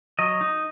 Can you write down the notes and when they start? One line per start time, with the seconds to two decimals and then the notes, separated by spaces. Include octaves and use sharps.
0.19 F#3 D#5
0.41 D#4